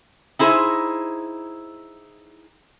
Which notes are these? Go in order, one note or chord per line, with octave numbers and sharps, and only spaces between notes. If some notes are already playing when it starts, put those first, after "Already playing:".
D#4 E4 G#4 C5